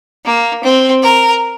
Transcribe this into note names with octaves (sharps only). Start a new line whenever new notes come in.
A#3
C4
A#4